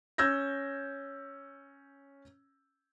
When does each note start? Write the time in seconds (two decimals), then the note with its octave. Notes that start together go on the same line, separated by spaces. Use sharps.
0.18 C#4 E6 G6 G#6 A#6